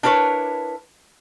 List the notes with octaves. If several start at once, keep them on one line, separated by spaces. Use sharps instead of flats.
D4 E4 A#4 B4 C#5